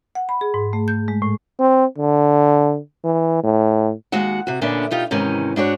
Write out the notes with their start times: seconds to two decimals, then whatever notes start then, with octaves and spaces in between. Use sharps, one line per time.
0.15 F#5
0.29 B5
0.41 G#4
0.54 G#2
0.73 A3
0.88 G6
1.08 G#3
1.22 A2
1.59 C4
1.98 D3
3.04 E3
3.44 A2
4.12 D#2 G#3 F#4 F#5
4.47 C3 F#4
4.61 A#2 D3 B3 C#4 D4 E5
4.91 B2 D#4 F4 G4
5.11 G#2 C3 D#3 E3 C#4
5.56 G#2 D4 F#4 C#5